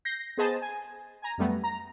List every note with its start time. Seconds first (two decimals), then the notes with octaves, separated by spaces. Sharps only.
0.05 G6 A#6 C7
0.37 B3 G#4 C5 D#5 A5
0.62 G#5
1.22 G#5 A#5
1.38 F#2 G3 A3 B3
1.64 A#5